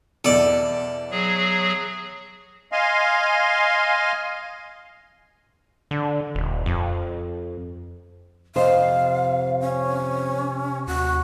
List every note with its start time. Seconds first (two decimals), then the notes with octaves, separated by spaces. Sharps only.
0.25 E2 B2 A4 D5
1.11 F#3 G#4
2.72 D#5 F5 G#5 C6
5.91 D3
6.35 D#1
6.66 F2
8.56 F2 C3 C5 D#5 F5
9.60 C#4
10.87 D#2 F#4